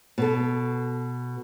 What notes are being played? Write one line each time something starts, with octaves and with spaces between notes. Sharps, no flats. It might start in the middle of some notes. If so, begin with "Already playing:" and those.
B2 A4